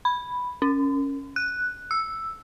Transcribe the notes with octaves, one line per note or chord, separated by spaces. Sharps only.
B5
C#4
F#6
E6